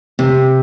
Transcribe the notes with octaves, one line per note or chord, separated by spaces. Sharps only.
C3